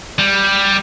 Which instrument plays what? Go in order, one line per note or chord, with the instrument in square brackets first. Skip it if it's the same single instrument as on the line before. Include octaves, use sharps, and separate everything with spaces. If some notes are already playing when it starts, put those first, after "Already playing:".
[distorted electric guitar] G3